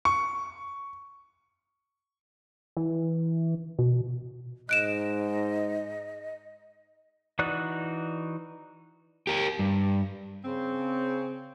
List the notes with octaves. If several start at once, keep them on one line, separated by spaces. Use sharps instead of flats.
C#6
E3
B2
G#2 D#5 F#6 D7 E7
E3 D#4 F#4 D5 F#6
G4 A#4
G2
C#3 C4